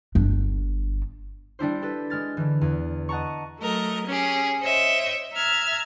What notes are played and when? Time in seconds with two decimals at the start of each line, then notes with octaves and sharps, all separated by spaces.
0.15 G1 D4
1.59 G3 D4 E4 C5
1.82 G4 A4 B4
2.10 G#3 F6 A6
2.37 D3 E3
2.61 E2
3.09 D#5 F#5 A5 A#5 C#6
3.59 F#3 A3 A#4 D#5
4.09 C#4 G4 G#4
4.62 C5 C#5 D#5 E5 G5
5.33 E5 A#5 F6 G#6